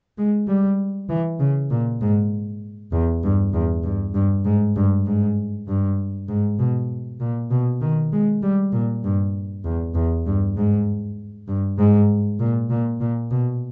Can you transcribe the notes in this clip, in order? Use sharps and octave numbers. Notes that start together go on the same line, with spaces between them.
G#3
G3
E3
C#3
A#2
G#2
E2
G2
E2
G2
G2
G#2
G2
G#2
G2
G#2
B2
A#2
B2
D#3
G#3
G3
A#2
G2
E2
E2
G2
G#2
G2
G#2
A#2
A#2
A#2
B2